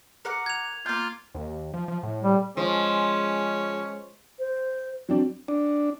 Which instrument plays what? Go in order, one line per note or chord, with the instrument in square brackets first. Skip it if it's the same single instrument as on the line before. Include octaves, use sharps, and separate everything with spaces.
[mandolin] A#4 F#5 D6
[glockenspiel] G#6 F7
[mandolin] A#3 G6 [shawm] F4
[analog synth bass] D#2
F3
F3
A2
[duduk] G3
[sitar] F3 [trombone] G#3 [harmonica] C#4
[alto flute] C5
[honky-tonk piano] F#3 C4 D4
[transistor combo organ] D4